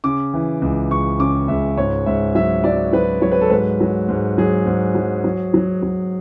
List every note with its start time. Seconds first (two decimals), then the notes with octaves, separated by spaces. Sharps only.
0.04 C#3 D6
0.34 E3
0.61 C#2
0.90 C#2 C#6
1.20 C#3 D6
1.48 C#2 E5
1.77 G#2 C#5
2.06 G#2 E5
2.35 F#3 E5
2.64 F#3 D5
2.93 F#3 B4
3.22 F#3 C#5
3.32 B4
3.41 A4
3.50 G#2 B4
3.80 F#3
4.08 G#2
4.38 F#3 G#4
4.66 G#2
4.95 F#3
5.24 F#3
5.54 F#3
5.83 F#3